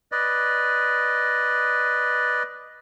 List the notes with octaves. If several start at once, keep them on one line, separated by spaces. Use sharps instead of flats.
B4 D5 D#5